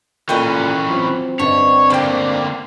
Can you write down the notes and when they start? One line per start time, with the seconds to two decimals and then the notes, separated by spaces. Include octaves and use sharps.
0.29 A#2 E3 C#4 A4 D#5 G5
0.90 F#3 C4 F4 C#5
1.39 G2 D3 B4 C#5 D#5
1.90 D3 A#3 D4 G5